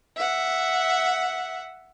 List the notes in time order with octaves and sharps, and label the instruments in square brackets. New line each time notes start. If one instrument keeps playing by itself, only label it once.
[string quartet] E5 F#5